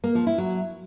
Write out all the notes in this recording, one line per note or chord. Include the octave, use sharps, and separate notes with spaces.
A#3
F3
E4
F#3